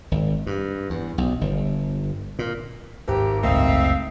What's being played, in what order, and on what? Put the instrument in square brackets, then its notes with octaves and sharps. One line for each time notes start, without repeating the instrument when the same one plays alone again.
[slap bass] G#1
G2
E2
B1
G1
A#2
[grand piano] G#1 [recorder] G4
[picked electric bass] F#1 C#2 A3 [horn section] C4 D#4 E5 [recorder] F5